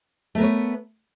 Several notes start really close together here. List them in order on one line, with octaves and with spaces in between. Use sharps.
A3 A#4 B3 C#5